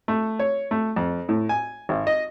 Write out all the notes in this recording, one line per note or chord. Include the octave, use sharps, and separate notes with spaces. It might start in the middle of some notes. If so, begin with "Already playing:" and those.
A3
C#5
A3
F2
A2
G#5
G#1
D#5